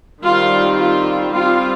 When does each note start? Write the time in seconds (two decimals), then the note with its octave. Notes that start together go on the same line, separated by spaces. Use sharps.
0.23 D#3 G3 C4 F4
0.78 F4
1.33 G3 C4 F4